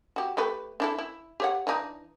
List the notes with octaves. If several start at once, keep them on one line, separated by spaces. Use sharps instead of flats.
F#4 G4
A3 G4 B4
D4 E4 A4
E4
G4 C#5 F#5
E3 D4 D#4